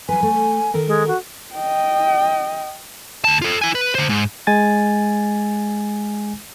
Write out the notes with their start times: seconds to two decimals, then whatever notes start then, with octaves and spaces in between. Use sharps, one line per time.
0.09 F#3 B4 G#5
0.23 A3
0.74 D#3 A4 A#4
0.87 G#3
1.08 F#4
1.54 D#5 G5
3.24 D2 A5
3.42 F4 A4
3.62 E4 G#5
3.75 B4
3.95 D3 C5
4.09 G#2
4.47 G#3 G#5 A6